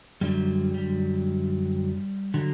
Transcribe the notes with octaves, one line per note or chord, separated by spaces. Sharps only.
F#2 D3 F#3 G3
G3
D3 F#3